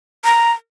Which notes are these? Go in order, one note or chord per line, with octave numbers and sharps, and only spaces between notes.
A#5